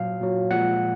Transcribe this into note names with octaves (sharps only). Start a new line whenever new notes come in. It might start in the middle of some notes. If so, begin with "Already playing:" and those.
Already playing: A#2 F#3 F5
A#2 F#3
A#2 F3 G#3 F#5